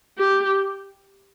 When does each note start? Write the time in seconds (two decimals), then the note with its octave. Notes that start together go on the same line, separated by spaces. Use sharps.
0.18 G4